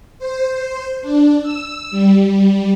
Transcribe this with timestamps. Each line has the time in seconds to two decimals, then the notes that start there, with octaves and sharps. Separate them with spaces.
0.19 C5
1.01 D4
1.41 E6
1.91 G3